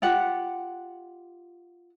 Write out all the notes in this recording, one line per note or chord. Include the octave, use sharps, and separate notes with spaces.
F4 G4 F#5